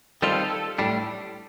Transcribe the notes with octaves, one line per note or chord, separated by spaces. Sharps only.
D#3 G3 C4 F4 A4
A2 G3 D4